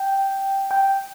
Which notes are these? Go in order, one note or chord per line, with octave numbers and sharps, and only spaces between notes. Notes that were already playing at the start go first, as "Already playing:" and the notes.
Already playing: G5
G5